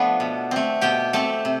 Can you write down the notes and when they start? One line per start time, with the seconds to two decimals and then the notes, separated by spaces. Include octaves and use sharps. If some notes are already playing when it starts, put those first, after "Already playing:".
Already playing: F3 A3 B3 D4 A4 B4
0.20 B2
0.51 A3 C4
0.81 B2 G4 G5
1.13 A3 C4 A4 A5
1.45 C3